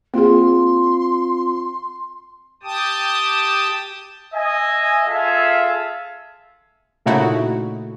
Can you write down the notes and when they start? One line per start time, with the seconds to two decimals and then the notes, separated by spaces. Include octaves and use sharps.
0.14 A#3 C4 F4 G#4 C6
2.63 G4 G5 A5 D#6
4.34 D#5 E5 G#5
5.06 F4 G#4 A4 E5 F5
7.06 A#2 C#3 A3 D#4 E4 F#4